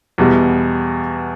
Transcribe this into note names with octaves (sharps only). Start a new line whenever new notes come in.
E2 B2 G3